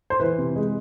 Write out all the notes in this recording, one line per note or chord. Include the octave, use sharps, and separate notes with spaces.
C5
E3 B4
C3
G#3